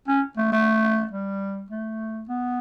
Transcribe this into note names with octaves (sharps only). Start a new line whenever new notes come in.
C#4
A3
A3
G3
A3
B3